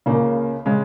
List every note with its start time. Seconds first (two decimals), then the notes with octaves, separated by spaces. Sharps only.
0.06 C#2 C#3 A#3
0.66 C#3 G#3